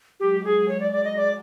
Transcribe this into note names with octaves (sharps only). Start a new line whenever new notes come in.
F#3 G#3 G4
G4
G#4
C#5
D5
D5
D#5
D5